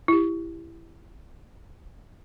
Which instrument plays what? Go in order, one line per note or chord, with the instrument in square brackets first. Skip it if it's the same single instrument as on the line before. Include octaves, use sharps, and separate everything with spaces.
[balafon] E4 G4